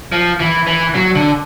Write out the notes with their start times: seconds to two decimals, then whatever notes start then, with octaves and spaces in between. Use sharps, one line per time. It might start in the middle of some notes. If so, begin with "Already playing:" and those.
0.12 F3
0.40 E3
0.67 E3
0.95 F#3
1.15 D3